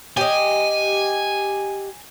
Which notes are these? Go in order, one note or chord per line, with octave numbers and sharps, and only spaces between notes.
G4 D#5 G#5